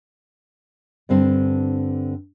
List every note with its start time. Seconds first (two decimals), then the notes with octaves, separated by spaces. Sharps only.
1.09 G2 D3 C4